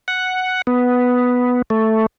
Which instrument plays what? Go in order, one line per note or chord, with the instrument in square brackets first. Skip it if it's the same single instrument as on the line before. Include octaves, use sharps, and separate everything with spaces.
[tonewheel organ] F#5
B3
A3